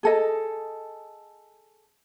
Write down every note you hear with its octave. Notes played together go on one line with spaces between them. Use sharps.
G#4 A4 D#5